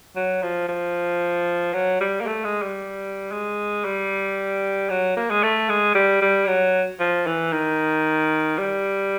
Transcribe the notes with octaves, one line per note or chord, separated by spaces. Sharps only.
F#3
F3
F3
F#3
G3
A#3
A3
G#3
G3
G#3
G3
F#3
A#3
G#3
A3
G#3
G3
G3
F#3
F3
E3
D#3
G3